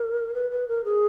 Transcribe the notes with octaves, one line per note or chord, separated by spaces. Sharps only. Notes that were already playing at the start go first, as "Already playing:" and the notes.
Already playing: A#4
B4
B4
A#4
G#4